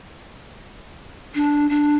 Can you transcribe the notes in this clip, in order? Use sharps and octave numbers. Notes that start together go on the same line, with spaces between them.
D4
D4